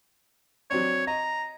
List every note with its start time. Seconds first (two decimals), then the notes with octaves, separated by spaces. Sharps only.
0.70 F#3 C4 D4 C#5
1.07 D#5 A#5